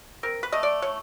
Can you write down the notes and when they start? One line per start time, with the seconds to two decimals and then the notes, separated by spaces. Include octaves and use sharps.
0.23 C4 A#4
0.43 B4
0.52 A3 D#5
0.63 D5
0.82 E3 C#5